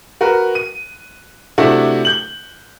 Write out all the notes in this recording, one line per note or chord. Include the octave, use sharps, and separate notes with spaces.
F#4 A#4 B4
D#7
C3 A3 D4 E4 F#4
G6 F#7